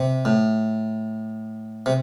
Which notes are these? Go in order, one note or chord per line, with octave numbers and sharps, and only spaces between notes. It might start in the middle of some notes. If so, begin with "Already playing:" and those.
Already playing: C3
A2
C3